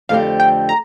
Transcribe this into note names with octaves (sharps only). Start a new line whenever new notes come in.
F2 D3 A3 C4 G4 F5
G5
A#5